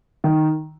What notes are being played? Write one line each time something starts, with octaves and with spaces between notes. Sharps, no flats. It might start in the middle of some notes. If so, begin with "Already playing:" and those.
D#3